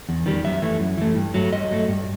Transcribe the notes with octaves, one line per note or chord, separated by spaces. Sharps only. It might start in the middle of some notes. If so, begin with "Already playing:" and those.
E2
D#3 G3
F#2 E5
E3 A3
F#2
E3 A3
G2
F#3 A3
G2 D#5
F#3 A3
G2